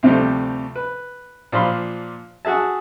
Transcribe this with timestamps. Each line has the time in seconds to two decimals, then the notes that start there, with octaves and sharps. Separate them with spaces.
0.03 D2 C3 F3 G3 A3
0.76 B4
1.52 A#2 F3 D4 F5 B5 C6
2.45 F#4 G#4 E5 A5